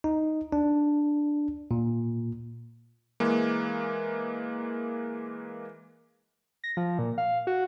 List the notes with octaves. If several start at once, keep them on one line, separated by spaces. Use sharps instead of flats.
D#4
D4
A#2
E3 G#3 A#3
A#6
F3
A#2
F5
F#4